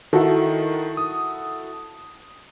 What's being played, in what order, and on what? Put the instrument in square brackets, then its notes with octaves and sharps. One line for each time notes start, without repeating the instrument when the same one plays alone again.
[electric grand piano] D#3 [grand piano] E4 F#4 A4
[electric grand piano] D#6